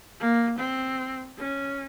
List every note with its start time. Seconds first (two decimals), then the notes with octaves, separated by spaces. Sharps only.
0.20 A#3
0.60 C4
1.38 C#4